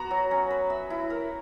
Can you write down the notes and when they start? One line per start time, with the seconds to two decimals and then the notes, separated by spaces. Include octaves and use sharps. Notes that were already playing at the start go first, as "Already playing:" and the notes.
Already playing: B3 F#4 A#5
0.11 F#3
0.31 C#4
0.50 B4
0.70 E5
0.90 E4
1.10 A#4